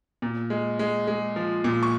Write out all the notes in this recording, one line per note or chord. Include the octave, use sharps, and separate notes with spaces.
A#2
G#3
G#3
G#3
F3
A#2
C#6